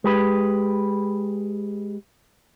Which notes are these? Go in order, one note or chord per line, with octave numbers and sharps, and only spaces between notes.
G#3 G4 B4